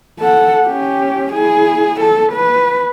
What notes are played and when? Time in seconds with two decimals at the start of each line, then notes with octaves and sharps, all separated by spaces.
0.19 A4 F#5
0.65 C#4 G4
1.33 E4 G#4
2.01 A4
2.33 B4